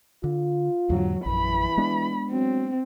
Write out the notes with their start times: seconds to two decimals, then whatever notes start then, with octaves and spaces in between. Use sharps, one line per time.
0.24 D3 F4
0.90 E2 G#2 D3 F#3
1.26 A#1 F#2 E3 B5
1.78 G#3 B3 D4
2.32 F#3 C4